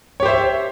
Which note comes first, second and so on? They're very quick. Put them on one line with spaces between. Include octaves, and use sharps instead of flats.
C#5 G4 C5 E5